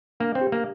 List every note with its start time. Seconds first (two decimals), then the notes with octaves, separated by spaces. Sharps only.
0.20 A#3 D4
0.35 C4
0.41 G4
0.52 A#3